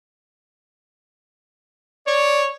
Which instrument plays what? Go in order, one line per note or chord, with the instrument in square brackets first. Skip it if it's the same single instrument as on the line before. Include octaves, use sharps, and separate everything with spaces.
[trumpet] C#5 [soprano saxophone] D5